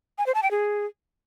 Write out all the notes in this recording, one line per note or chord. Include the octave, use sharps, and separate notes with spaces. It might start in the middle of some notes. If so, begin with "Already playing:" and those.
G#5
C5
A5
G5
G#4